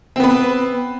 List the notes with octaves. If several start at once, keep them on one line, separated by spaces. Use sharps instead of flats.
B3 C4 B4